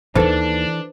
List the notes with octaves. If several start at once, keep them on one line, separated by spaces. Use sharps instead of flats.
D#2 D#3 E3 D4 A4 B4 C5